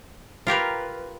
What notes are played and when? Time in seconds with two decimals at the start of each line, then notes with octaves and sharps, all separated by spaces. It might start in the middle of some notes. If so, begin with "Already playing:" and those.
0.47 F4 G4 A#4 B4